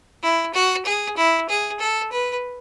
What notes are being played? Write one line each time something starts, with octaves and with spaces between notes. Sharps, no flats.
E4
F#4
G#4
E4
G#4
A4
B4